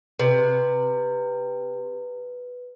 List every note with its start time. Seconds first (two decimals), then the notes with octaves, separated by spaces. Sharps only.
0.19 C3 B4